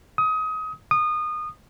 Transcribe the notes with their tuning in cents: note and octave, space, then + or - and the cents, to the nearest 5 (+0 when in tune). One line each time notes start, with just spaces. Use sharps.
D#6 +25
D#6 -25